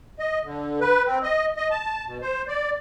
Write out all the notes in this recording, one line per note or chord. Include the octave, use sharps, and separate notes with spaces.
D#5
D3
B4
C4
D#5
D#5
A5
B2
C5
D5